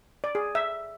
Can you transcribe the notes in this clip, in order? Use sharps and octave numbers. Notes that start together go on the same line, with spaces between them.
D5
G#4
E5